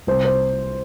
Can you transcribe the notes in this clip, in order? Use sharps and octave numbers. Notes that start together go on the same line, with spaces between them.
C2 C5
C5